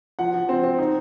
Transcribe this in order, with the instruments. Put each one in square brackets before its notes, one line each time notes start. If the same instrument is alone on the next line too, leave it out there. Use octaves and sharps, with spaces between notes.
[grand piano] F3 F#5
F3
C4
C4
D#4